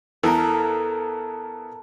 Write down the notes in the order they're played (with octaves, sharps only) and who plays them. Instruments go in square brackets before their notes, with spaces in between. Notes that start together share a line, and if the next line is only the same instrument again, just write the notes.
[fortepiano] E2 E3 [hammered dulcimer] A4 [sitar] A#4